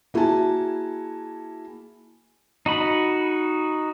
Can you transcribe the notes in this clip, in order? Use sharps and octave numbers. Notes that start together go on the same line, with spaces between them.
A#3 E4 F#4 G#4 G#5 A5
D#4 F#4 B5